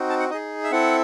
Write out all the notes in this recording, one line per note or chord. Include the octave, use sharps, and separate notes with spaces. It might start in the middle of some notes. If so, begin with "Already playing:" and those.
Already playing: C4 D#4 F#4
A5
F#5
D#4 G#4 D#5
E5
C4 E4 A4 F#5